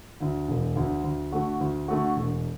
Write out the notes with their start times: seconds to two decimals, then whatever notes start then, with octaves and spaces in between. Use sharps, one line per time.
0.20 D2 D3
0.48 E1
0.76 D2 D3
1.04 D2
1.32 D3 A3 F#4
1.61 D2
1.88 D3 A3 F#4
2.16 E1